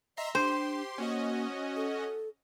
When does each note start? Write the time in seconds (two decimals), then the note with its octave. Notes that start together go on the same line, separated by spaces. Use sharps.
0.17 D#5 E5 A#5 C6
0.35 D4 G4 C5 C6
0.98 A#3 C#4 F#4 D#5
1.76 A4